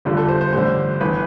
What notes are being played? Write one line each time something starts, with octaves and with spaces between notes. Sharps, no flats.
G1 G2 D3 F4
A4
C5
C5
A1 G2 D3 C5
G1 E3 B4